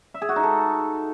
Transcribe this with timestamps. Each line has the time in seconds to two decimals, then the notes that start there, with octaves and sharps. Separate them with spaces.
0.14 E5
0.22 G#4
0.29 F#4
0.36 D#4
0.43 A4